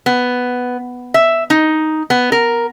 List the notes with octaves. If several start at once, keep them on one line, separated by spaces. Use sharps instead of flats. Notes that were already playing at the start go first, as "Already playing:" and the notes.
B3
E5
D#4
B3
A#4